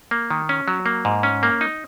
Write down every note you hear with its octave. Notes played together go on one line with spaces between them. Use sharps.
A#3
D#3
C#4
F#3
A#3
G#2
C#4
A#3
D#4